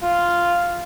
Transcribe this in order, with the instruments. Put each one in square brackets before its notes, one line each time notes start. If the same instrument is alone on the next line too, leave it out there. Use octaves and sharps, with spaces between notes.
[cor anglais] F4